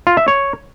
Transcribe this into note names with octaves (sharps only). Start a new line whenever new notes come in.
F4
E5
C#5